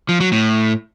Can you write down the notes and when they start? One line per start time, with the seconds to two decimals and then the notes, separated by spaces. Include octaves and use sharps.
0.09 F3
0.20 F#3
0.32 A2